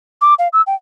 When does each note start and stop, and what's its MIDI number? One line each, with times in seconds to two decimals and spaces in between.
0.21 0.34 86
0.39 0.48 77
0.53 0.62 88
0.67 0.75 79